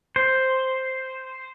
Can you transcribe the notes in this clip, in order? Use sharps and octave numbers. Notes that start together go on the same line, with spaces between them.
C5